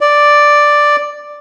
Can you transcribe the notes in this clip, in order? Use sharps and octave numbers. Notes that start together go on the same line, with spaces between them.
D5